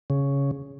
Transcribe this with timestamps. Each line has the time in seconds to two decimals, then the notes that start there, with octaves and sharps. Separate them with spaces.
0.10 C#3